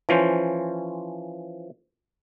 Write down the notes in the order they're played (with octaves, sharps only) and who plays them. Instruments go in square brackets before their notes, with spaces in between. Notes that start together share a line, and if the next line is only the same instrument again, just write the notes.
[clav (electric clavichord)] E3 F3 C#4 C5